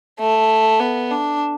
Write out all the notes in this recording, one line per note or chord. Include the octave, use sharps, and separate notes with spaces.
A3
B3
D4